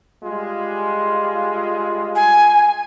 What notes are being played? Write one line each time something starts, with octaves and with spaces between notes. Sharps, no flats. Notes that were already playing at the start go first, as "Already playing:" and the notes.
G3 G#3 F4
G#5